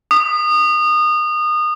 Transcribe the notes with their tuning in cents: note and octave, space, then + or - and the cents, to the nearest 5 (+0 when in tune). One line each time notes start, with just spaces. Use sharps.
D#6 -25